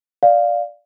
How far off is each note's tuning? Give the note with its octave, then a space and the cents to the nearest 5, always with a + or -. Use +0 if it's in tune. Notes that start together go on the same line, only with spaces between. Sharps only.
D5 +0 F5 +0